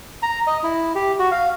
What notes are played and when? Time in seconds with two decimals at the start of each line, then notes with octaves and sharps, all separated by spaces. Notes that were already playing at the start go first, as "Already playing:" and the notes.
0.23 A#5
0.47 D#5
0.63 E4
0.95 G4
1.19 F#4
1.31 F5